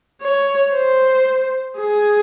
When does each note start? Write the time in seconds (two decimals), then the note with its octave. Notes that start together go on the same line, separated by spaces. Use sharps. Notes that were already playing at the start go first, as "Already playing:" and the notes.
0.22 C#5
0.73 C5
1.79 G#4